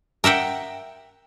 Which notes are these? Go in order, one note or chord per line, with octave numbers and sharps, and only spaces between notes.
A#4 E5 F#5 G5